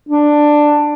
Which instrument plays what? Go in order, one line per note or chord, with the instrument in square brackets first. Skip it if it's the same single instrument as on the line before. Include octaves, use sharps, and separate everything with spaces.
[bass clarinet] D4